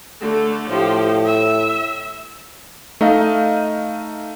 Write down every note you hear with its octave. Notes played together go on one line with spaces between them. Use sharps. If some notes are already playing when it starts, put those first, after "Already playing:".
D3 A3
A2 F3 G4
E5
A3 D#4 D#5 F5